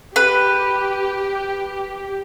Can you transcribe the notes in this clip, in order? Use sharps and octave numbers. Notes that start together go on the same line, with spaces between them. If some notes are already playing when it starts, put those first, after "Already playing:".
G4 B4